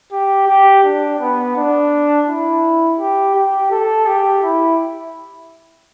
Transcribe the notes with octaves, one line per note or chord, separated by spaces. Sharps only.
G4
G4
D4
B3
D4
E4
G4
G4
A4
G4
E4